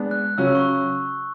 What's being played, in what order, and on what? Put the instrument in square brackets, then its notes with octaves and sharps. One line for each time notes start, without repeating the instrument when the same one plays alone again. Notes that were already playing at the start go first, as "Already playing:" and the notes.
Already playing: [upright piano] G#3 B3 D4
[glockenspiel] F#6
[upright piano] C#3 F#3 C#4 F#4 [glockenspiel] E6
[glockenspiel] C#6